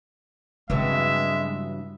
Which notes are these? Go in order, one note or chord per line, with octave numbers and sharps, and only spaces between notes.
G2 C#3 E3 F#3 G#3 C4 E5